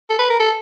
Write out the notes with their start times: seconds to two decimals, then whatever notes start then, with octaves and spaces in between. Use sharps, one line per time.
0.10 A4
0.19 B4
0.30 A#4
0.40 A4